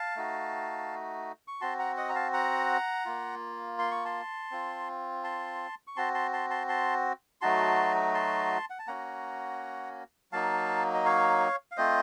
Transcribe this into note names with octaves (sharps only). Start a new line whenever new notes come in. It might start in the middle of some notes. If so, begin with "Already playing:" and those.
Already playing: F5 A5
A3 D#4 F#4
C#6
C4 F#4 A5 C6
F#5 A#5
D#5 F#5
A#5
F5 A5
F#5 A#5
A#3 F4
C6
C#6
A5 C6
C4 F4
A5 C6
C#6
C4 F#4 A5 C6
A5 C6
A5 C6
A5 C6
A5 C6
F#3 A3 D#4 F#4 A5 C6
A5 C6
F#5
A5
A#3 C#4 F#4 F#5 A#5
F#3 A#3 D#4 F5 A5
D#5
C#5 F5
F5
A3 C4 F4 C5 D#5